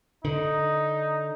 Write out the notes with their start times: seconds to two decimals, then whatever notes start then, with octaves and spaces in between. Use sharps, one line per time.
0.25 D3 D#4